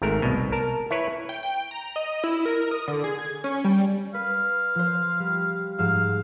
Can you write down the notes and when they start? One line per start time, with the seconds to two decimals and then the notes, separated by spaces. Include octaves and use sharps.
0.02 G#1 G#2 A3 A#4
0.22 C2 B2
0.52 A#4 A5
0.91 E4 B4 C#5
1.29 G5
1.43 G5
1.71 A#5
1.96 D#5
2.24 E4
2.45 A#4
2.71 D#6
2.88 D3
3.04 G#4
3.19 G#6
3.44 C#4
3.64 G3
4.14 B4 F5
4.75 F3 C5
5.20 G3
5.78 G#2 F3 F5 E6